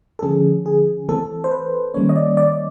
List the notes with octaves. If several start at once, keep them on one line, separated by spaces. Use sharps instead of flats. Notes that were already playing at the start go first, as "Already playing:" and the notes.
A4
D3 F3 A3 C#4 G#4
G#4
E3 A3 C4 A4
C5
B4
D#3 G3 A#3 C#4 C#5
D#5
D5
D5